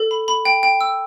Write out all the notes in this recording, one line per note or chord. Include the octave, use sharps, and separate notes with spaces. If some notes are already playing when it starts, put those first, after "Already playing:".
Already playing: A4
B5
B5
G5
G5
E6